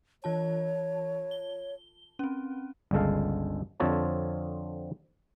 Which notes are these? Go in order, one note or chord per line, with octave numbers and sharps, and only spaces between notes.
E3 F4 C#5 A5
G7
C4 C#4
G1 C#2 G#3 A4 F5
F2 D3 C4 F4 C#5 A5